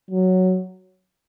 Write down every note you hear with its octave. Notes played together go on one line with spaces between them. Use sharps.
F#3